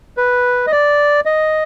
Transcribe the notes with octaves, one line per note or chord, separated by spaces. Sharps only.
B4
D#5
D5
D#5